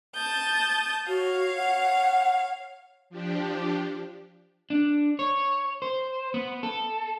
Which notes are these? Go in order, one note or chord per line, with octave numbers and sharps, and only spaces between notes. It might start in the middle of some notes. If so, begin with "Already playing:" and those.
A5 D#6 G6
F#4 C#5 F5
F#5
F3 D4 G4
D4
C#5
C5
B3
A4